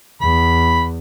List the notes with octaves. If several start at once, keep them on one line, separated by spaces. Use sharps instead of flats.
E2 B5